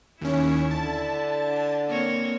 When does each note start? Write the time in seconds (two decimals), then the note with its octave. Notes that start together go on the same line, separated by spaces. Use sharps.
0.21 D#2 C#4 E4
0.71 D3 A5
1.88 A#3 C4 C#5